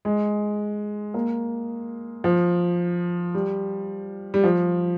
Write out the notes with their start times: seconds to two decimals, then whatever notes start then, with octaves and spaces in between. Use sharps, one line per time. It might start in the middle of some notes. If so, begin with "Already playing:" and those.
0.05 G#3
1.14 A#3
2.24 F3
3.34 G3
4.34 G3
4.44 F3